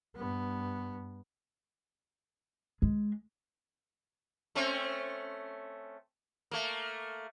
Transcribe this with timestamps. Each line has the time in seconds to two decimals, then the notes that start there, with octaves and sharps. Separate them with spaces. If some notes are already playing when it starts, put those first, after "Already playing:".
0.16 G2 B3
2.82 G#3
4.55 A3 C4 C#4
6.51 A3 A#3